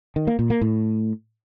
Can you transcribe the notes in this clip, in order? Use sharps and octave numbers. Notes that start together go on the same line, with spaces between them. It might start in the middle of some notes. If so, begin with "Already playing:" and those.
D#3
A#3
A#2
A#3
A2